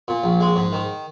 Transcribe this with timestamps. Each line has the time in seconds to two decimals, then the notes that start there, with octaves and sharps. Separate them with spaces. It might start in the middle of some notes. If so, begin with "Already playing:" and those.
0.08 A#2
0.24 A#1
0.41 G#3
0.56 G#2
0.72 D#3